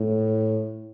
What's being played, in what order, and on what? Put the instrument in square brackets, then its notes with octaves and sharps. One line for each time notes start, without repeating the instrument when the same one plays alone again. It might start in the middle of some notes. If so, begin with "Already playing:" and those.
Already playing: [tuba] A2